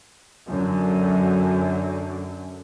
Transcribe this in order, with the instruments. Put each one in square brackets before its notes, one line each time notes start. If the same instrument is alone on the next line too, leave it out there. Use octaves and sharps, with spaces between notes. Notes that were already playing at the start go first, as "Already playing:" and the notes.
[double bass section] F#2 D3